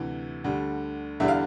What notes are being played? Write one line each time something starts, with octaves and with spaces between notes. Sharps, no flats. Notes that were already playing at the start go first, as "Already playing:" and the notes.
Already playing: D2 C3 E3
D2 D3 G3
E2 D3 G3 E5
F5